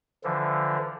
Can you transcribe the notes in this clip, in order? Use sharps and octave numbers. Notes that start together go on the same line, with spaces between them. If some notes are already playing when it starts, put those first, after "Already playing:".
D3 E3 F3